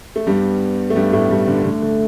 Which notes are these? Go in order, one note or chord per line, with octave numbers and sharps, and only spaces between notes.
A3
G2 G3 B3
A3
G2 G3
A2 A3
G2 G3
D3
D3 A3
D3